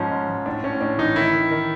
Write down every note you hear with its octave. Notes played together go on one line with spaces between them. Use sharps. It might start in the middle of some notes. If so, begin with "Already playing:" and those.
Already playing: G#2 F3 C#4
G#2
F3
A2 D4
A2 C#4
A2 D4
E3 D#4
D#3 E4
D#3
D#3